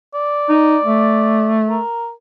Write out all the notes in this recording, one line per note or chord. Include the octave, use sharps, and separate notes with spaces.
D5
D#4
A3
A#4